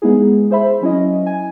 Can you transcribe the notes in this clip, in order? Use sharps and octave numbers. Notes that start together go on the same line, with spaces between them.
G#3 B3 D#4 E4 G#4
G#4 C5 E5 B5
F#3 C#4 E4 D#5
G#5